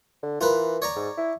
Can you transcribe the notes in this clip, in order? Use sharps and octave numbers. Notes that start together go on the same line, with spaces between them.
D3
E3 F4 A#4 B4
C#5 D5 A#5
G#2
E4